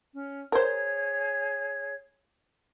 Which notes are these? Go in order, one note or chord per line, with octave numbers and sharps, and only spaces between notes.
C#4
G#4 A#4 C5 C#5 G#6